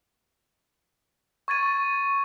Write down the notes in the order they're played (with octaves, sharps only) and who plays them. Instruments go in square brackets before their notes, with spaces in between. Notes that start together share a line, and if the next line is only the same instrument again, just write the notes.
[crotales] C#6 G#6 A6 D#7